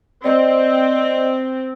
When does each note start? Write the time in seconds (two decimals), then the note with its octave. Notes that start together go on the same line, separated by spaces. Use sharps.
0.24 C4 D5 D#5